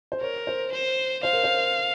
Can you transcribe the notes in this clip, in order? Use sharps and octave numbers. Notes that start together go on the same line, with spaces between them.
C5
A#4 C#5
C5
C5
C5 F5
A#4
C5